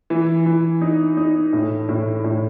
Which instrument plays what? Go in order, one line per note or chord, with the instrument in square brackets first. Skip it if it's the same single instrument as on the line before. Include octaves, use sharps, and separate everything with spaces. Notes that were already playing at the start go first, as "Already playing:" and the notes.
[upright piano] E3
E3
D#4
D#4
A2
A2
A2